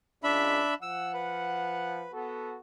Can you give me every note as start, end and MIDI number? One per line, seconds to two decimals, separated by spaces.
0.23 0.62 37
0.23 0.74 62
0.23 0.74 76
0.23 0.74 83
0.82 2.06 53
0.82 2.06 78
0.82 1.12 88
1.14 2.12 71
2.13 2.58 59
2.13 2.58 66
2.13 2.58 69